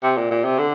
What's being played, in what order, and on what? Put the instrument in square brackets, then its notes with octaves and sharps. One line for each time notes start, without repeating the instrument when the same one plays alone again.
[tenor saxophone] C3
A#2
A#2
C3
D3